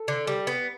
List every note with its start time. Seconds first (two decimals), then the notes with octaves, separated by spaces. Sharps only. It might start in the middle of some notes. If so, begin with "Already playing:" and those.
Already playing: A4
0.08 D3
0.27 G3
0.47 B3